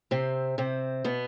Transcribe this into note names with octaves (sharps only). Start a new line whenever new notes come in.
C3 C4
C3 C4
B2 B3